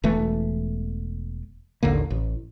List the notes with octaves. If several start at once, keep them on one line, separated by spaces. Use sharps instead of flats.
E1 E3 A3
A1 D#2 D3 A#3
A1